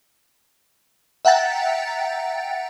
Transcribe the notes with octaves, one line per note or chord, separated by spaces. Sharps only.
E5 F#5 G5 A#5 A6